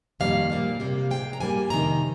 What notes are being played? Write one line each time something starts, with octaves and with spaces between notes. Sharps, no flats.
F2 D#3 G3 A#3 F5
A#2 G3 A#3
C3 G3 A#3
C3 F3 G#3 G5
A#5
G2 G3 A#3 G#5
F2 C3 D#3 A#5